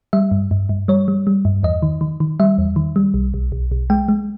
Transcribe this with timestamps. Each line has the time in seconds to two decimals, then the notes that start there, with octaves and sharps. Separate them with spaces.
0.13 G3 E5
0.31 G2
0.51 G2
0.69 G2
0.88 G3 C#5
1.08 G3
1.27 G3
1.45 G2
1.63 E2 D#5
1.82 D#3
2.01 D#3
2.20 D#3
2.40 G3 E5
2.58 E2
2.76 D#3
2.96 G3
3.14 B1
3.34 B1
3.52 B1
3.71 B1
3.90 G#3 G5
4.08 G#3